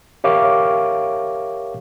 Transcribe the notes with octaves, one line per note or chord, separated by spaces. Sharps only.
G4 A#4 C#5 E5 F5 D6